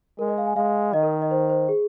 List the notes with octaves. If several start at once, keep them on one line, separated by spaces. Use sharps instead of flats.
G#3 A#4
D#5
F5
G#5
G#3 F5
D#3 D#5
A#4
D#5
C5
C5
G#4